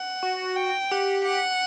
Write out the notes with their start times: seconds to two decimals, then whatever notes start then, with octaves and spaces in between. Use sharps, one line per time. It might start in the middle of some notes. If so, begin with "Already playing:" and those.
Already playing: F#5
0.23 F#4
0.56 G5
0.91 G4 F#5
1.25 F#5